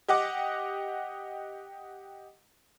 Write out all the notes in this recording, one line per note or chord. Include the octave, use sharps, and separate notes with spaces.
G4 D#5 F#5 D6